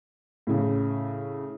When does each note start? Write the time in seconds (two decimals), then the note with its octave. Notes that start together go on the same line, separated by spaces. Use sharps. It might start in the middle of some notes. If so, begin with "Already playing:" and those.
0.47 A2 C#3